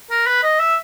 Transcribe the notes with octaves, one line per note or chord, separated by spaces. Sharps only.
A#4
B4
D#5
E5